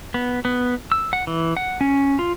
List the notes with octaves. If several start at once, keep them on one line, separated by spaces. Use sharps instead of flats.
B3
B3
E6
F#5
E3
F#5
C#4
F4